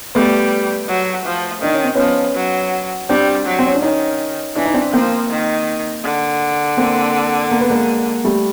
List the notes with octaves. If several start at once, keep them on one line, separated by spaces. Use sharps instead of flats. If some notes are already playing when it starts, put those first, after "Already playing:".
G3 A3 B3
F#3
F3
D#3 D4
C#4
C4
F3 B3 C#4
F#3
G3 C4 D4
F#3
C4
C#4
D4
D#3 C#4 D#4
E3 D4
D#4
C4 D4
F3 A#3 C4
D#3
D3
A#3 C4
A#3
B3
G#3 A#3
G3 A3